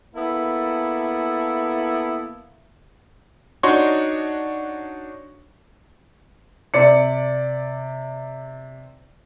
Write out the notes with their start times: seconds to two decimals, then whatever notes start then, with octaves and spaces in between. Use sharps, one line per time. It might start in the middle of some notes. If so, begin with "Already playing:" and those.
0.15 A#3 B3 E4 A4
3.63 D4 D#4 F#4 C#5 C6 C#6
6.74 C3 D5 C#7